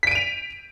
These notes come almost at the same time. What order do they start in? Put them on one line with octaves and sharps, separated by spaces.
B6 D7 D#7 F7